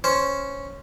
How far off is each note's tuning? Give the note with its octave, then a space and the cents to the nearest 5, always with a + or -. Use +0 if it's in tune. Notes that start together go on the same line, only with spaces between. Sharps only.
C#4 +0 C5 +0